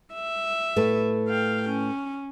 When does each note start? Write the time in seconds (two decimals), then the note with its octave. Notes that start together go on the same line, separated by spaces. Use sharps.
0.13 E5
0.76 A2 A3 B4
1.28 F5 G5
1.69 C#4